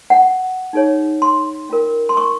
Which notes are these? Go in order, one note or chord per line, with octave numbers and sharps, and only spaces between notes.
F#5
D#4 G#4 C#5
C6
C#4 F4 A#4
C6
C#6